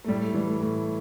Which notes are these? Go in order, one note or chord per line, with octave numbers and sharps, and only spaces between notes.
A3
A2 G3
A3
E3 G3
A3
A2